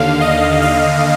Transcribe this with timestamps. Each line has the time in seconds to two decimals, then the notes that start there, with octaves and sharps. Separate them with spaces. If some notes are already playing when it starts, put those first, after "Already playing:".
Already playing: D#2 D3 F5
0.21 D#5
0.62 F5